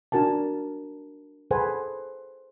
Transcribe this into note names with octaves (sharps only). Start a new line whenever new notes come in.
D4 F#4 A#4 G#5 A5
G#4 A4 B4 C5 F#5 G#5